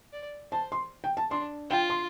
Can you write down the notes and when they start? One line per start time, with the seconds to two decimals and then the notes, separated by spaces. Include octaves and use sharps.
0.13 D5
0.52 C5 A5
0.72 C6
1.04 G5
1.17 A5
1.30 D4 C6
1.70 F4 G5
1.90 C6